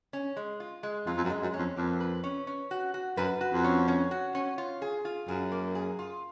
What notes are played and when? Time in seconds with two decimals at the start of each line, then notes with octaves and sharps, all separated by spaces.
0.13 C#4
0.37 G#3
0.60 F4
0.83 G#3
1.06 F2 F4
1.17 F2
1.24 F#2
1.30 G#3
1.42 F#2
1.54 C#4
1.59 F2
1.77 F2 A#3
2.00 B4
2.24 C#4
2.47 C#4
2.71 F#4
2.94 F#4
3.17 F#2 B4
3.41 F#4
3.53 F2
3.64 C#4
3.88 C#4
4.11 F#4
4.35 C#4
4.58 F4
4.82 G#4
5.05 F4
5.28 F#2 G#4
5.52 A#3
5.75 G#4
5.99 F4